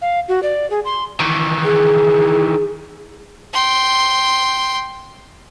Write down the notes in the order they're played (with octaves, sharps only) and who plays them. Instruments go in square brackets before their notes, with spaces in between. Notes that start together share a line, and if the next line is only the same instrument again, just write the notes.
[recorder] F5
F#4
D5
G#4
C6
[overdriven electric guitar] D#3 E3
[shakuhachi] G#4
[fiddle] G5 C6